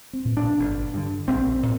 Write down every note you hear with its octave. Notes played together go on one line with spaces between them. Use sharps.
C4
A#2
D4
G1
G2 D3
A#1 C4
A#2